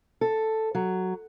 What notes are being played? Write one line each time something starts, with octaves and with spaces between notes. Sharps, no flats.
A4
F#3